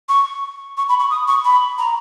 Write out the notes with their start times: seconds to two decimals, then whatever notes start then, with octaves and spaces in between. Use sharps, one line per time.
0.09 C#6
0.77 C#6
0.89 B5
1.00 C#6
1.10 D#6
1.28 C#6
1.45 B5
1.78 A#5